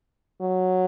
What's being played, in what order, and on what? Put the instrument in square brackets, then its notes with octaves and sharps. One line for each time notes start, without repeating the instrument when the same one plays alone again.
[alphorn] F#3